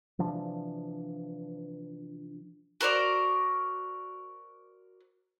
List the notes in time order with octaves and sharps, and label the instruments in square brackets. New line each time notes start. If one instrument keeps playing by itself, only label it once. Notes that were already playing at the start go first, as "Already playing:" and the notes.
[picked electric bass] C3 E3 F3 D4
[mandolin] F#4 A#4 C5 D5